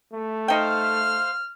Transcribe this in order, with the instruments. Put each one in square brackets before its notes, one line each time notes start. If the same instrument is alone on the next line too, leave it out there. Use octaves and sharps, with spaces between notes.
[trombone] A3
[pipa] D#4 G5 [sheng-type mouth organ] C5 F5 [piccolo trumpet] F6